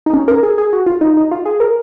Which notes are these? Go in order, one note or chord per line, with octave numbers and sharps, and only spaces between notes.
D#4
C#4
A#4
G#4
G#4
F#4
F4
D#4
D#4
F4
G#4
A#4